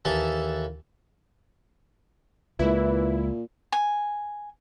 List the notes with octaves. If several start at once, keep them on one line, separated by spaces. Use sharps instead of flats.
D#2 E3 A4 A5
C#2 A#2 E3 G#3 E4
G#5